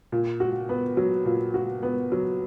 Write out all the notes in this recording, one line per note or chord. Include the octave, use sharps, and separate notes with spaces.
A#2
F#4
B3
F#3
A#2
F#4
B3
F#3